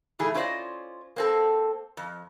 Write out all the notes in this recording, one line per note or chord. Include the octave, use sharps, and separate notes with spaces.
A#2 E3 A3 G#4
C#4 E4 F4 C5 D5 D#5
A#3 C4 A4
F2